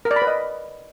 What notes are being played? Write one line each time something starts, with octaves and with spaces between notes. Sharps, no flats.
A#4
D5
B5
B4
D#5